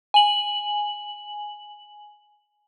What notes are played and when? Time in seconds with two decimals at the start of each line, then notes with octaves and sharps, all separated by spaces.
0.14 G#5 F#7